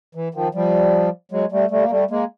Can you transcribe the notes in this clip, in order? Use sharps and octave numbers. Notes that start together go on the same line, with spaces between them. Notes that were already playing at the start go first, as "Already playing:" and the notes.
E3
D#3 F3
F3 G3
F#3 G#3
G3 A3
G3 A3
A#3
G3 A3
G#3 A#3